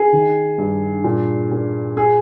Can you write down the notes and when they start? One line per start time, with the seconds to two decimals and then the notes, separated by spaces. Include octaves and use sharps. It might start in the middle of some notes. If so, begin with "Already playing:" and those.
Already playing: G#4
0.13 D#3
0.58 G2
1.04 A#2
1.51 A#2
1.97 G#4